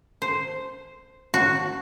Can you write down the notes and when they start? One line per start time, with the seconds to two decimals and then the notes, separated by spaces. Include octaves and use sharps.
0.22 C5
1.34 F#4